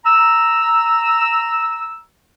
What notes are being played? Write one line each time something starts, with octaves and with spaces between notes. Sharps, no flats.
A#5 E6